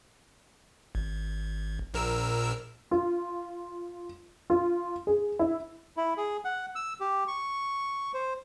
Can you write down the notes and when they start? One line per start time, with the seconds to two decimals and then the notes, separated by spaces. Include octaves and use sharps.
0.95 G#1
1.94 A#1 A#4 E6
2.91 F4
4.50 F4
5.07 G#4
5.39 E4
5.97 E4
6.17 G#4
6.45 F#5
6.75 E6
7.00 G4
7.28 C#6
8.14 C5